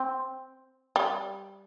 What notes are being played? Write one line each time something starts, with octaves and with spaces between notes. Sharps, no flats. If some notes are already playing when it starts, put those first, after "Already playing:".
Already playing: C4
G3